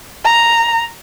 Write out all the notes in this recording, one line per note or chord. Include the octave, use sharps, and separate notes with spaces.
A#5